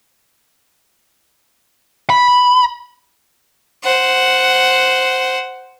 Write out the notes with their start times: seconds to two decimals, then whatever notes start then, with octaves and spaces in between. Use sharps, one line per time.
2.10 B5
3.84 C5 F#5